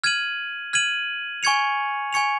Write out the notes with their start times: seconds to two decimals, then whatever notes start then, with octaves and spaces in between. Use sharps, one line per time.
0.04 F6 G#6 D#7 F#7
0.73 F6 G#6 D#7 F#7
1.43 G#5 C#6 G#6 C#7 F7
2.13 G#5 C#6 G#6 C#7 F7